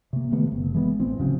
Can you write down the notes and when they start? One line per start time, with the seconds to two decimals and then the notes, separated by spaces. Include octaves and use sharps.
0.13 C3 A#3
0.32 C3 D#3 A3 B3
0.52 F#1
0.74 E3 G#3 A#3 B3
0.99 A1 E3 C4
1.18 F1 C#3 F#3 C4